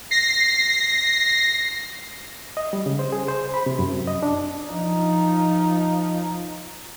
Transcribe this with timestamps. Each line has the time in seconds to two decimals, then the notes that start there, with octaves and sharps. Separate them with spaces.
0.11 A#6 C7
2.57 D#5
2.73 G3
2.86 C#3
2.99 C5
3.12 G#4
3.28 C5
3.54 B5
3.66 C3
3.79 F#2
4.07 D#5
4.23 D4
4.69 F3 D#4